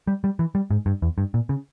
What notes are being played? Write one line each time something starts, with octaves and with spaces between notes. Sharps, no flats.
G3
G3
E3
G3
G#2
G2
E2
G2
A#2
C#3